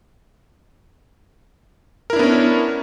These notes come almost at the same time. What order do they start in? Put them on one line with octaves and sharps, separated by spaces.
A#4 E4 D4 B3 C#4